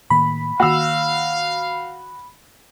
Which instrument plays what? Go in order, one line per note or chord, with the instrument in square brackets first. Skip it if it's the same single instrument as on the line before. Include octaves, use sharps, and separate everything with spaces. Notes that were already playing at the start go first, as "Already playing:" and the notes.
[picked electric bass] A2 D#3 A#3 [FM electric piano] B5
[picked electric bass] D#3 A#3 [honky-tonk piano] F#4 E6 [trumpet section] F5